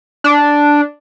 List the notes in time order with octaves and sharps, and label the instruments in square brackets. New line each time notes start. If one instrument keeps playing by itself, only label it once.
[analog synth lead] D4